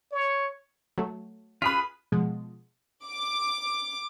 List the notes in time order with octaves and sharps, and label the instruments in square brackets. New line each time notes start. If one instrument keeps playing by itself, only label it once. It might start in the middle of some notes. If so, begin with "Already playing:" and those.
[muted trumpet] C#5
[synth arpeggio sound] F#3 A3
[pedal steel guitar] F4 G#4 B4 [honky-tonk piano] B5 B6
[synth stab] B2 F3 G#3
[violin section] D6